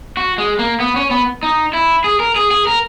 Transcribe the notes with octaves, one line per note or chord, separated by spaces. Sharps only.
F#4
G#3
A#3
B3
C#4
B3
D#4
E4
G#4
A#4
G#4
G#4
A#4